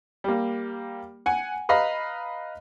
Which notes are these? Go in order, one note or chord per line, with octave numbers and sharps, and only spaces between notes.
G3 A#3
F#5 G#5
B4 D#5 F5 A#5 B5